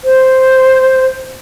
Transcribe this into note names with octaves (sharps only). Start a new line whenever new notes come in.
C5